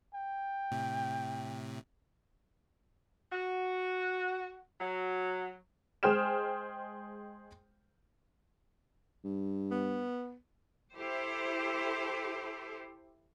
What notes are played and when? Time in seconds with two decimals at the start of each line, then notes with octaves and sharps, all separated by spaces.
0.14 G5
0.71 A2 C3
3.31 F#4
4.79 F#3
6.03 G#3 G#4 C5 G5 F6 E7
9.24 G2
9.71 B3
10.94 E4 G4 A4 C5